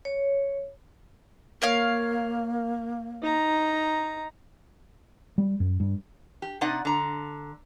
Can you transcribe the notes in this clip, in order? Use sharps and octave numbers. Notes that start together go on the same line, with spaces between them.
C#5
A#3 A#4 C#5 F5
D#4 A#5
G3
F#2
G2
G4
C3 D#4 D5 F#5
D3 A#5